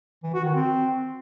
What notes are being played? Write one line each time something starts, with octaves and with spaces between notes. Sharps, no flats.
E3
F#4
D#3
C4